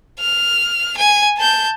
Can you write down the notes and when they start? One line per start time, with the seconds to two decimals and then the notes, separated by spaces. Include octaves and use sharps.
0.19 F6
0.97 G#5
1.37 A5 G6